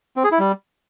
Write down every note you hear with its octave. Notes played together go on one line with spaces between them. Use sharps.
C4
G#4
E4
G3